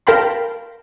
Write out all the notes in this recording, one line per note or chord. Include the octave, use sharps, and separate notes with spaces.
A#4 F5 G5 A5 B5 C6